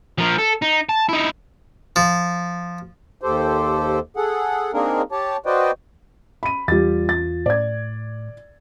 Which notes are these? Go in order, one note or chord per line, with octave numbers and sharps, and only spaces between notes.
F3 A#4
A4
D#4
A5
D#4 E4
F3
D#2 G4 A4 C5
G#4 A4 F#5
A#3 C4 D4 D#4 G#4 A#4
G4 C#5 A5
F#4 B4 C5 D5 D#5 G5
B5 D#7
E2 G3 F4 A6
A6
A2 D5 G#6